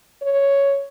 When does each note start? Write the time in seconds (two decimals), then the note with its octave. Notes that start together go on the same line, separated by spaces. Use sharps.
0.22 C#5